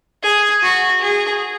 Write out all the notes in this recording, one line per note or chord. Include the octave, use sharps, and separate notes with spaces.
G#4
F#4
G#4